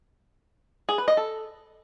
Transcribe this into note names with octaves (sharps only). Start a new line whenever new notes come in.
G#4
B4
D#5
A4